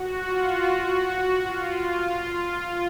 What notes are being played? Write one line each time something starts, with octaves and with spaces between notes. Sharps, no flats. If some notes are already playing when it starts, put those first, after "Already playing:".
Already playing: F#4
F4
F#4
F4